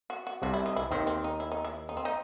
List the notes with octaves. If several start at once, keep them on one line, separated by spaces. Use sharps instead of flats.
F#4
F#4
C2 C3 F#4
E4
D#4
E4
D#2 D#3 C4
C4
D#4
E4
D#4
E4
D#4
C4
D#4